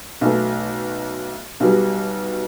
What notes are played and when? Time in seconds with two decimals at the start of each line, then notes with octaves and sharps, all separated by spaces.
0.21 B1 B2 A3
1.60 B1 B2 G3